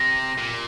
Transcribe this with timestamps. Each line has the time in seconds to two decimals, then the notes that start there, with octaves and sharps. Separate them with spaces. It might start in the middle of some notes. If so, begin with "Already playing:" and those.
Already playing: C3 A#6
0.38 A#2